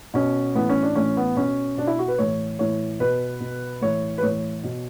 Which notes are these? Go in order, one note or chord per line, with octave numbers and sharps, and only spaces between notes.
B2 C#4
A2 E3 B3
C#4
D4
A2 E3 C#4
B3
B2 C#4
B2 D4
E4
F#4
B4
A2 E3 C#5
A2 E3 C#5
B2 B4
B2
A2 E3 C#5
B4
A2 E3 C#5
B2